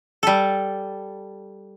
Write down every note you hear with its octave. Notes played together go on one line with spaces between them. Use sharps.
G3 A4